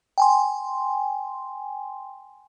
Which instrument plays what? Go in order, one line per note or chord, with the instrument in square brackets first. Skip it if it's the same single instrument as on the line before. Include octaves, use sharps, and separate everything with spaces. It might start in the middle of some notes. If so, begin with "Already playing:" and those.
[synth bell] G5 G#5 C6